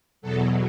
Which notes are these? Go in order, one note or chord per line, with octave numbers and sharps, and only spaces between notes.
E2 B2 F#3 A4